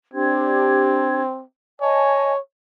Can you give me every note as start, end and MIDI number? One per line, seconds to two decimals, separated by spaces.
0.14 1.44 60
0.14 1.20 62
0.14 1.20 67
0.14 1.20 92
1.81 2.39 73
1.81 2.32 75
1.81 2.32 80
1.81 2.32 81